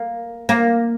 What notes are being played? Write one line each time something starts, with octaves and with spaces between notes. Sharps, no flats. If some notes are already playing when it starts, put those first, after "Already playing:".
Already playing: A#3
A#3